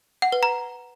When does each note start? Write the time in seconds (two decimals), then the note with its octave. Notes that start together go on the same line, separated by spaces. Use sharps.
0.22 F#5
0.32 B4
0.43 A#5